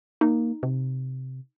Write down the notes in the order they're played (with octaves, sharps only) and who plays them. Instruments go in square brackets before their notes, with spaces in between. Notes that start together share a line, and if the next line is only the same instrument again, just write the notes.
[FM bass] A#3 [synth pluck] D#4
[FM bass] C3